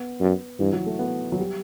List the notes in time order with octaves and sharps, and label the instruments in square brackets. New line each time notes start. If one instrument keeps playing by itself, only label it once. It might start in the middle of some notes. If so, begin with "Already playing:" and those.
Already playing: [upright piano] B3
[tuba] F#2
[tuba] G2 [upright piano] E3
[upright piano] F#3
A3
B3
F#3
G3